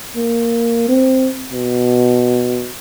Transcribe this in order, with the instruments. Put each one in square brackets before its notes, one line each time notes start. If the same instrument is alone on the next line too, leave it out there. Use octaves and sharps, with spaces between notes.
[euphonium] A#3
C4
B2